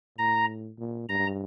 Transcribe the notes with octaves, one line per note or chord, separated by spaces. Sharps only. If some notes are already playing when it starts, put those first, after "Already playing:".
A2 A#5
A#2
G2 A#5